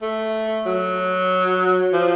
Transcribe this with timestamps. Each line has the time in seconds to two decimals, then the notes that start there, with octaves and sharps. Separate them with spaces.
0.02 A3
0.66 F#3
1.93 F3